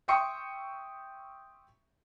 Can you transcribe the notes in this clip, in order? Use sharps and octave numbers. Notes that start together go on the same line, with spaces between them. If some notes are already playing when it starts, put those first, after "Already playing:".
E5 G5 C6 C#6 D#6 C#7